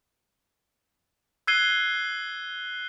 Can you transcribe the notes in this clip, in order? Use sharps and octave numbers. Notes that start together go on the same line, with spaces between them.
E6 F#6 G#6 C7 D#7 G7